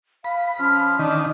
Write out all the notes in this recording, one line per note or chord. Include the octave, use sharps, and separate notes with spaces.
F5 B5
F3 C#4 F6
D#3 D4